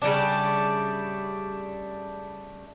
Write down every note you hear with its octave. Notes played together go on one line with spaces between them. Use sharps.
C#3 G3 A3 D4